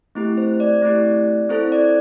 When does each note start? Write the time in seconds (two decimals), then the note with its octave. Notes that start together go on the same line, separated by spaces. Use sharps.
0.15 A3 C4 E4 G4
0.37 C5
0.60 D5
0.82 A3 C4 E4 G4
1.49 C4 E4 A4 C5
1.72 D5